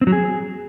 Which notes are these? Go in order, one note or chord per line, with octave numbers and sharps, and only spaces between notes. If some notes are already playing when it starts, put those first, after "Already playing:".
C4
F#3
G#4